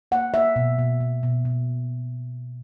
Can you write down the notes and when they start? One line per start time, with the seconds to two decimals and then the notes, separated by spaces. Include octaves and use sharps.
0.11 A#3 F#5
0.34 A#3 E5
0.56 B2
0.79 B2
1.01 B2
1.23 B2
1.45 B2